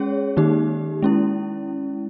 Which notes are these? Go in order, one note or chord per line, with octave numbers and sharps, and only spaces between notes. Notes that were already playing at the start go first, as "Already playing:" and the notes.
Already playing: G#3 C#4 G#4 C#5
D#3 A#3 D#4 G4
G#3 C#4 E4